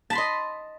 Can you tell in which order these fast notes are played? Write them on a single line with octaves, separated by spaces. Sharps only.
A5 B5 C6 D#5